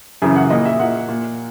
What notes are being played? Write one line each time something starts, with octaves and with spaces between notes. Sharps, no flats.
F#2 C#3 E3 G#5
F#5
A#2 D#5
E5
A#2 F#5
A#2